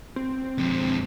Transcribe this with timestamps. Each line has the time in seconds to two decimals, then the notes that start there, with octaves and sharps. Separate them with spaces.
0.16 C4
0.58 F2 G#3